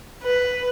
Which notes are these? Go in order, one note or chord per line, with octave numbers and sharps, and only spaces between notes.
B4